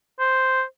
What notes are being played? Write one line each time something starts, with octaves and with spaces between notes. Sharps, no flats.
C5